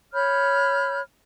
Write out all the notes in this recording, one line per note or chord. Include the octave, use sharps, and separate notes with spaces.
C#5 B5 F6 G6